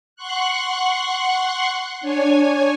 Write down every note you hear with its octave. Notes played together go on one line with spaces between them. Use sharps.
F#5 C6 C#6 F#6
D4 C#5 G#5